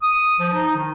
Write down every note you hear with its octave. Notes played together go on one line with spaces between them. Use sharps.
D#6
F3
D#4
D#3